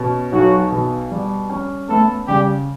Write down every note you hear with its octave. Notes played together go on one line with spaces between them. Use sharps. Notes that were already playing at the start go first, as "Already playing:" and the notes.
Already playing: B2 C#4
B1 F#3 F#4
B2
G3
C#4
A3 B3 A4
C#3 G3 G4